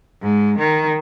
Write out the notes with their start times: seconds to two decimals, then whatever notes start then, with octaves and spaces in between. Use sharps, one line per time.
0.22 G#2
0.59 D#3